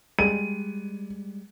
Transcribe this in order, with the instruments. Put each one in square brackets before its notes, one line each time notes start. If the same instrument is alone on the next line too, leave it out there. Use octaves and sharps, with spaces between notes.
[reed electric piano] G3 G#3 [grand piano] D#7